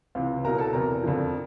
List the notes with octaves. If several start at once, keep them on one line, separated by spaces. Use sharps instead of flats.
C#2 C3 E3
C2 B2 F#3 A#4 A#5
A4 A5
E2 C3 E3 A#4 A#5
F2 D3 F3